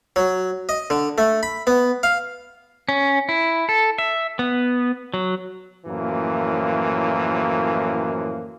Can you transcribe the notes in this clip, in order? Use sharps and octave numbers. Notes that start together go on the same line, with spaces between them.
F#3
D#5
D3
A3
B5
B3
F5
C#4
E4
A4
E5
B3
F#3
F#2 A2 E3 F3 A#3